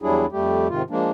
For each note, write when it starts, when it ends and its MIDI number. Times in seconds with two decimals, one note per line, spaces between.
0.02 0.26 40
0.02 0.26 54
0.02 0.26 55
0.02 0.26 62
0.02 0.26 64
0.02 0.26 68
0.32 0.67 41
0.32 0.67 55
0.32 0.67 57
0.32 0.67 67
0.69 0.82 44
0.69 0.82 48
0.69 0.82 51
0.69 0.82 65
0.90 1.11 53
0.90 1.11 56
0.90 1.11 58
0.90 1.11 62